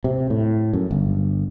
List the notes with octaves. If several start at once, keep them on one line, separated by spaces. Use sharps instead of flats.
C3
A2
F#2
G1